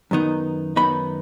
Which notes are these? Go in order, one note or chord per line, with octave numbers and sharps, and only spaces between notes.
F#2 D#3 B3 D#4
F#2 D#3 B3 D#4 B5